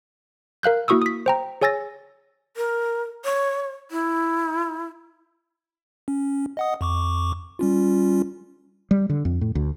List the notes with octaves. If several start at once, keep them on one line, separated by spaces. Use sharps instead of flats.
A#4 F5 F#6 G6
A#3 E4 F#4 C#6 D#6 E6
D#6 B6
C5 G5 A#5
G#4 C#5 G#5 E6 A6 A#6
A#4
C#5
E4
C#4
D#5 F#5 D#6
F2 C#6 D6
G3 C#4 F4
G3
D3
F2
A2
D2